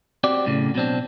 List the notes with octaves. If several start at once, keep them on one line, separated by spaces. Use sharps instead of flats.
C4 F#4 G4 D5
B1 A2 C#3
B2 F#3 C4 D4